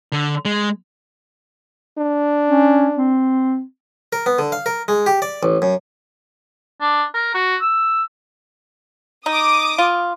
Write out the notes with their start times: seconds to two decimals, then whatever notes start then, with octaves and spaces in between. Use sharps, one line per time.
0.12 D3
0.45 G#3
1.98 D4
2.49 C#4
2.96 C4
4.13 A#4
4.26 B3
4.39 D3
4.52 F5
4.66 A#4
4.88 G#3
5.06 G4
5.22 D5
5.43 A1
5.62 F#2
6.81 D4
7.14 A#4
7.34 F#4
7.61 E6
9.26 D#4 D6 D#6
9.78 F4